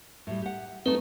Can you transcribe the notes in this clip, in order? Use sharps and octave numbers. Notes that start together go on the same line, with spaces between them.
A2 G3
G4 F#5
G3 A3 C4 D#4 B4